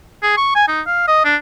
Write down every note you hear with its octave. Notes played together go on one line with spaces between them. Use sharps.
G#4
C#6
G#5
D#4
F5
D#5
D4